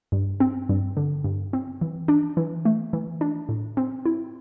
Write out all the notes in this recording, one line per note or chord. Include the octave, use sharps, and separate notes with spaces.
G2
C4
G2
D3
G2
C4
E3
D4
E3
A3
E3
D4
A2
C4
E4